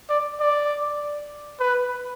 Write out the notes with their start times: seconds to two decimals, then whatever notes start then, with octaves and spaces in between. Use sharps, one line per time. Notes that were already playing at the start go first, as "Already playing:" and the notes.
0.10 D5
0.40 D5
1.60 B4